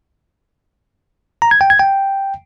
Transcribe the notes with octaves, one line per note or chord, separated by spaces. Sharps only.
A#5
G#6
G5
G#6
G5